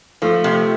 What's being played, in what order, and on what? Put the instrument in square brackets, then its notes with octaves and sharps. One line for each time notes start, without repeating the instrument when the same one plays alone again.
[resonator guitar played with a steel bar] F3 [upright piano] A3
[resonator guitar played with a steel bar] C3